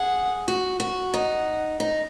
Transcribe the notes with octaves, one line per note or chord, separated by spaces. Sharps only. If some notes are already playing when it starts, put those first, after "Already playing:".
Already playing: G#4 F#5
F#4
F#4
D#4 F#5
D#4